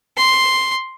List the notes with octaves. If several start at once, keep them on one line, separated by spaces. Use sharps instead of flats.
C6